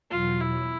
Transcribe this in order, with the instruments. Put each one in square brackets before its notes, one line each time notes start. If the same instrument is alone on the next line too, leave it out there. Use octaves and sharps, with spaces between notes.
[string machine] E2 B2 F#3 [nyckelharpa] F4
[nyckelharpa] E4